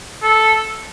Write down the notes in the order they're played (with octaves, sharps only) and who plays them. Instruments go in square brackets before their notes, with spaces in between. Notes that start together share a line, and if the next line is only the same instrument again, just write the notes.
[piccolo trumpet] A4